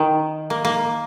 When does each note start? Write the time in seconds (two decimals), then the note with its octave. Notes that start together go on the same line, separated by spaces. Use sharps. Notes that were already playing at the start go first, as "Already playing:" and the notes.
Already playing: D#3
0.50 A#3
0.65 A#3